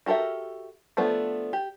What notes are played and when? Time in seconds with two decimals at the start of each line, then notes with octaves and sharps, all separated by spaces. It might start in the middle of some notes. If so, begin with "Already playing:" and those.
0.06 F#4 G4 A4 A#4 E5
0.97 F3 A3 B3 D4
1.53 G4